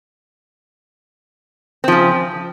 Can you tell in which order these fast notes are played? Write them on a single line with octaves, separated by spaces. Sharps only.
C4 F3 C#3